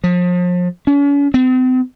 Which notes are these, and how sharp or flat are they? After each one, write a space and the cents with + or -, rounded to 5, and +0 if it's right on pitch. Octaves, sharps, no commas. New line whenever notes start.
F3 +35
C#4 +40
C4 -40